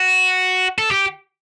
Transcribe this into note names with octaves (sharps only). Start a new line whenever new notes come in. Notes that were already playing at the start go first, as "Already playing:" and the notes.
Already playing: F#4
A4
G4